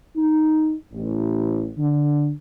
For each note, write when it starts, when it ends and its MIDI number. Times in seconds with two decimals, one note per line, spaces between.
0.16 0.75 63
0.92 1.70 33
1.78 2.31 50